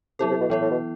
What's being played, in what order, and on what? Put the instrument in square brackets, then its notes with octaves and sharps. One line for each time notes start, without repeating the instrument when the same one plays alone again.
[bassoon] C3 [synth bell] F#3 B3 E4 A4
[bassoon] C3
B2
[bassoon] A2 [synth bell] E3 B3 E4
[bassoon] A2
B2